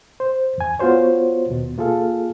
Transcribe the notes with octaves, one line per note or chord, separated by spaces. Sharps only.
C5
E2 G#5
B3 F4 F#4 C5 C#5
D#2 B2
A#3 F4 G#4 A4 F5